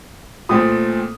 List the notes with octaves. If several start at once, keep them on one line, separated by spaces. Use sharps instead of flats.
A#2 A3 C4 D#6